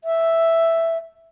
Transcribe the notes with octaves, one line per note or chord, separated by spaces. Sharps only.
E5